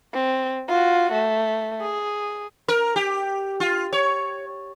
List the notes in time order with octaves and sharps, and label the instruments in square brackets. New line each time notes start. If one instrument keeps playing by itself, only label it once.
[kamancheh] C4
F4 F#4
A3
G#4
[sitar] A#4
G4
F4
C#5